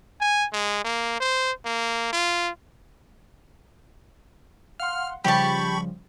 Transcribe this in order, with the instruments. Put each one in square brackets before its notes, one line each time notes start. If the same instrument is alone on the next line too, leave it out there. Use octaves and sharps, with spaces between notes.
[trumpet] G#5
G#3
A#3
C5
A#3
F4
[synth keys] F5 F#5 C6 [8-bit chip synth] F6
[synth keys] C#3 F3 G3 [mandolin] G4 A5 [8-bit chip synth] B5 C#6